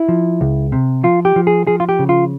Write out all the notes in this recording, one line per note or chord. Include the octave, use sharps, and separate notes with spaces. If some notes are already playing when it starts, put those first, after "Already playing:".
Already playing: E4
F3
C#2
C3
F3 F4
G4
F3
G#4
F3 G#4
F4
G4
C#3
F4